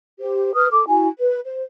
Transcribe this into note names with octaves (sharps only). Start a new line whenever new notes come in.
G4 C5
B4 D#6 F6
A4 D6
E4 F#4 G#5
B4
C5